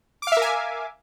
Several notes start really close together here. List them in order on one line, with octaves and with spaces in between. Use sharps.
D6 F5 E5 A#4 G#5